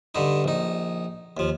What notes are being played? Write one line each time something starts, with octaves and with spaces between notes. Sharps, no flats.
G2 D3 D#4
A#1 D#4
D#2 F3